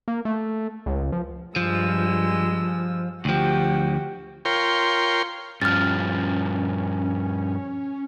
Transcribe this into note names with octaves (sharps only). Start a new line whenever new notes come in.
A#3
A3
C#2
F3
G2 F3 G#3 E6
D2 F3 F#4 G4
F4 A#4 C#5 G5 C6
G2 F3 C#4 F6 A6